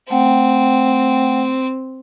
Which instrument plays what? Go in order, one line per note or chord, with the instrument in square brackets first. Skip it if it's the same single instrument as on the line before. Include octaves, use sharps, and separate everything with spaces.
[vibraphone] A3 F#5 G5 [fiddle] C4